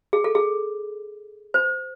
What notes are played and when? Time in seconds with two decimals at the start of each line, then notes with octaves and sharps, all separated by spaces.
0.13 G#4
0.24 A4
0.35 G#4
1.54 C5